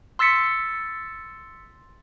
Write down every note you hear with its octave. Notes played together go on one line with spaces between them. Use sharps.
C6 E6 A6 B6 C#7